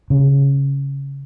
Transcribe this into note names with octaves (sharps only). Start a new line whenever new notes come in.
C#3